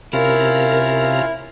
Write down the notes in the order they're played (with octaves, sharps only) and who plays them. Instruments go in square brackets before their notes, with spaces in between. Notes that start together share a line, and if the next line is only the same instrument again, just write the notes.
[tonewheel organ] C3 A#5 [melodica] C#4 F4 F5 [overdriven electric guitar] E4 [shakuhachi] A#4